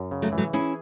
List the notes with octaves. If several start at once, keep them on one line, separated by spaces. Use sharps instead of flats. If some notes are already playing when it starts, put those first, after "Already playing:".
Already playing: F#2
C#3
F#3 A3
E3
F#3 A3
C#4 E4 G#4